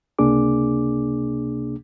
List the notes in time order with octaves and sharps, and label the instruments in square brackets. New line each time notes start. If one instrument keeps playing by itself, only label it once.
[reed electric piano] C#2 C3 A#3 D4 G#4 D6